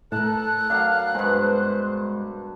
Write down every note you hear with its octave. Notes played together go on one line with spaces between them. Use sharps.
A2 A4 A#4 A5 F#6
F#3 D4 F5
G2 B2 G#3 C5